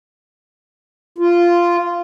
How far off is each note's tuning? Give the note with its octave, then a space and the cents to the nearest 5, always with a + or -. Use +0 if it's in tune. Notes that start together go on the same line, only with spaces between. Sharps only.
F4 -10